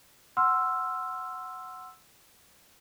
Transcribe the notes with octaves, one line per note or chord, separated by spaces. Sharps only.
F#5 C6 E6 F6